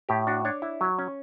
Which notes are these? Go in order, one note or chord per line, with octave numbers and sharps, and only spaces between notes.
A2 G4
D4 F#4
D4 C#5
E4
F#3
C#4